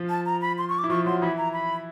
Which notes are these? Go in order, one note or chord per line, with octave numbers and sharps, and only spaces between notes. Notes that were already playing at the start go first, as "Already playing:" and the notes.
Already playing: F3 F4
A5
A#5
B5
C6
C#6
D6
E4
F3 F4 C#6
F#3 F#4 C6
E3 E4 B5
A#5
B5